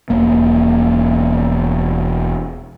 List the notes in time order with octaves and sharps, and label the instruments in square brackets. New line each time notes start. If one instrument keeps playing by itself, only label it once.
[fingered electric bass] E1 A#3